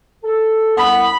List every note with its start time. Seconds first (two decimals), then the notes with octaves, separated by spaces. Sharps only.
0.23 A4
0.77 C2 B3 B5